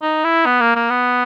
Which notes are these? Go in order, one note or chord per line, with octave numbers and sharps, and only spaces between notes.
D#4
E4
B3
A#3
A#3
B3